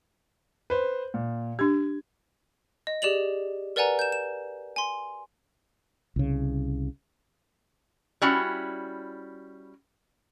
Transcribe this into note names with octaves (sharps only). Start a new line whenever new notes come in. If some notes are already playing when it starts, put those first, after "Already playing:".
B4 C5
A#2
D4 G4 G#6
D#5
G4 G#4 D5 F7 F#7
A#4 B4 D5 F#5 G#5 A#5
G6 E7
E7
G#5 C6
C2 C#3
G3 C#4 E4 F#4